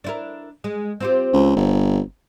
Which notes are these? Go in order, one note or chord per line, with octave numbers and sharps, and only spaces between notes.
D4 E4 A#4
G#3
C4 F4 G4
C#2
G1